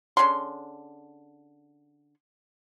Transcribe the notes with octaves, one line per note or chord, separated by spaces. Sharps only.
D3 C#4 G#4 C6